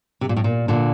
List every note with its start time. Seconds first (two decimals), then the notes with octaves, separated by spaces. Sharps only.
0.21 C3
0.29 A#2
0.36 A2
0.44 A#2
0.68 A#2 D3